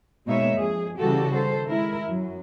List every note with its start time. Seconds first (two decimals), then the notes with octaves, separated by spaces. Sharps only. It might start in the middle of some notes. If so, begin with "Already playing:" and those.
0.27 B2 G#3 A#3 D#4 C#5 E5
0.57 F2 G#4
0.99 C#3 E3 G3 F#4 G4 A4
1.33 D#3 A4 C5
1.68 G#3 E4 A#4
2.07 F#2 F#3